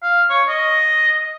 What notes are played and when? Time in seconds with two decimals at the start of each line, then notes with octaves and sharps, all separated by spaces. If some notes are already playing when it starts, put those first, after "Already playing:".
0.03 F5
0.29 C#5
0.49 D#5